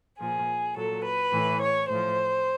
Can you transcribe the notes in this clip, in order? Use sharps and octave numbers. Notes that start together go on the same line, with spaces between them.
A#2 F3 G#4
A#2 F#3 A4
B4
A2 E3
C#5
A2 F3 C5